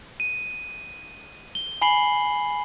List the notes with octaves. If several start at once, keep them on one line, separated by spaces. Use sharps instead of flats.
D#7
G7
G#5 B5 C7 F#7 G7